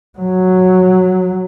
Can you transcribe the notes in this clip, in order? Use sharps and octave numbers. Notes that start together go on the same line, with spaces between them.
F#3